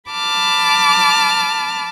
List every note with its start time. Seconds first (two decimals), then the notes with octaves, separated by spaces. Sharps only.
0.11 A5 B5 D6 F6